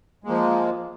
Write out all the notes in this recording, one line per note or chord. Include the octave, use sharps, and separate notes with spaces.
F3 G#3 A#3